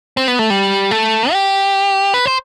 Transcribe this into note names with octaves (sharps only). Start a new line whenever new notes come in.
C4
B3
A3
G3
A3
G4
B4
C5